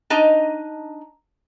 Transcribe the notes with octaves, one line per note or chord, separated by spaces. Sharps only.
D4 D#4 D#5 A#5